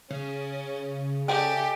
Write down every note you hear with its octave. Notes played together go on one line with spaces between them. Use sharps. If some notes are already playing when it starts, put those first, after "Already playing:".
C#3 C#4
G4 A4 D#5 G5 G#5